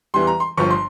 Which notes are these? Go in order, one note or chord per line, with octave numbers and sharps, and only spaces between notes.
E2 E3 G3 C6
A#5
C6
G1 G2 F3 C#6
C6